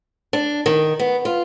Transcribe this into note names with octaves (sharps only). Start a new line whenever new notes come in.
D4
D#3
B3
F4